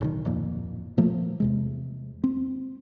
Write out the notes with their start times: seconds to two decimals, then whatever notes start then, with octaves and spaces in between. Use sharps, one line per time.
0.01 D1 B1 D#3
0.25 D1 F2 A#2
0.97 A#2 F3 A3 A#3
1.40 E2 C3 G#3
2.24 C4